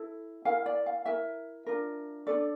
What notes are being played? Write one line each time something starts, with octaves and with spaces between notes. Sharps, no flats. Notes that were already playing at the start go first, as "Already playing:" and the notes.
Already playing: E4 A4
E4 A#4 F5
D5
F5
E4 A#4 E5
D4 F4 A#4
D4 F4 A4 D5